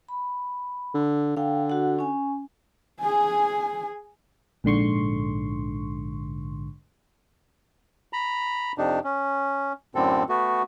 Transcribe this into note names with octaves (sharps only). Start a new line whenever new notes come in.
B5
D3
D3 F5 G5
F#4 F#5
C#4 G#5
G#4 G#5
A#1 G#2 D3 C6 C#6
A#5 B5
F2 C3 D4 D#4
C#4
F#2 A2 D3 C4 A4
A3 B3 F#4